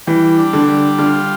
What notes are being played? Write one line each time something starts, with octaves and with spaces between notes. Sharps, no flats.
E3 G3
D4
D3
G3
D3 F4